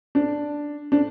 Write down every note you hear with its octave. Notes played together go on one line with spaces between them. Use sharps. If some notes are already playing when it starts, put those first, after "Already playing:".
D4
D4